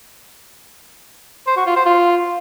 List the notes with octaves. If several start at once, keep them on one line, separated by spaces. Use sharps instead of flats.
C5
F#4
F4
C5
F4